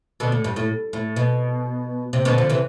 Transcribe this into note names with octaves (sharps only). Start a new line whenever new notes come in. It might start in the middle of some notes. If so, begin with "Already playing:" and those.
B2 D3
A2
G2
A2
A2
B2
C3
B2 D3
D3 F3
C3 E3